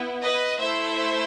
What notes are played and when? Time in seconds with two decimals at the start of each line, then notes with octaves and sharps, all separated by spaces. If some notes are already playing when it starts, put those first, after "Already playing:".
Already playing: B3 E4
0.21 B4 D#5
0.59 A3 E4 A4 C5 E5